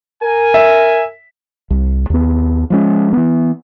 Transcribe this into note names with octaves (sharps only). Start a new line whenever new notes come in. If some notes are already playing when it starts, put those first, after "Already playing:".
A#4 G#5
E5
C2
D#2 B3
F3 G#3 C#4
E3 B3